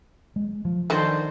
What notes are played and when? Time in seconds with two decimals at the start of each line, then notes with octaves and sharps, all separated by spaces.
0.36 G#3
0.65 F3
0.90 D3 D#3 D4 F#4 C5